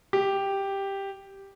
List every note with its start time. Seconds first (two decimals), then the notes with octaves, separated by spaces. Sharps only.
0.13 G4